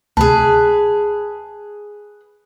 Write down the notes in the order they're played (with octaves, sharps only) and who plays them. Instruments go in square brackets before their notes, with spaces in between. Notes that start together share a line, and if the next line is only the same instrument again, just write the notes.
[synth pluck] D2 C3 [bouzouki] G#4 B4 [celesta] A5